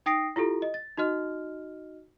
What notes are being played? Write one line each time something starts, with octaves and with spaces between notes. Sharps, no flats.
D#4 G5 D#6 A#6 C7 D7
E4 F4 G4 A4
D#5
A6
D#4 F#4 D#5 F6